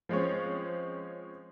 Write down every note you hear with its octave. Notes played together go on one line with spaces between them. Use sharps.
F3 G#3 C4 C#4